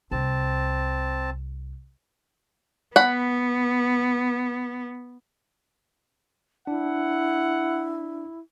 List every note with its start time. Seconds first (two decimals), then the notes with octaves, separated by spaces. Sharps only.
0.11 C2 C4 A5
2.96 B3 F#5 B5
6.67 D4 E4 F#5